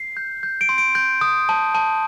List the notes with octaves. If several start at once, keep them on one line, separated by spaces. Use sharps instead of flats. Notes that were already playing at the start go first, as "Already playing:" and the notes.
Already playing: C7
G6
G6
D7
C6
D7
G6
D#6
A5
A5